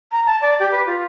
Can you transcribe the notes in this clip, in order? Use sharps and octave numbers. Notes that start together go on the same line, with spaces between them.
A#5
A5
D5
G4
B4
F4